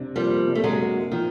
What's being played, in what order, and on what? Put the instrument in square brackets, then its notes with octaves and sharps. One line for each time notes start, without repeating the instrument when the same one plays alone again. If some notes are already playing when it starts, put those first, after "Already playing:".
Already playing: [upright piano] C3 D4
[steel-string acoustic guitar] F3 G3 [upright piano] A#3
[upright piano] C3
[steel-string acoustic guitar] A3
F#3 G#3
[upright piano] A#3
[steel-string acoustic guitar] D#3 [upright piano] F3